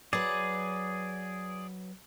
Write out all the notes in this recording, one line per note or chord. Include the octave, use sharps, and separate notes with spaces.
F#3 G#4 B4 D5